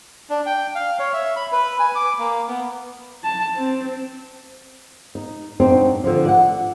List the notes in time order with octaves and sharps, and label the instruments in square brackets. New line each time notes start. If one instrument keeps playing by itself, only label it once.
[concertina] D4
G5
F5
C#5
E5
B5
B4
G#5
D6
A#3
B3
[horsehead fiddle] A5
C4
[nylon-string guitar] D#4
F#2 C4 D4 D#4
D3 D#3 F3
D5 E5 F#5